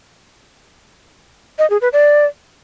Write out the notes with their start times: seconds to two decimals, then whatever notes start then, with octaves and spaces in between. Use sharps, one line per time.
1.59 D#5
1.70 G#4
1.81 B4
1.93 D5